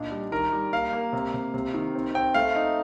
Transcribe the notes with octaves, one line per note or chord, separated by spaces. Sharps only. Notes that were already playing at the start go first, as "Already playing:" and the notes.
Already playing: A#2 D4 D#4
G3
D#3 A#4
G3
A#3 F5
A#3
C3
C3
C3
D#3
C4
C4 G5
A3 F5
D#4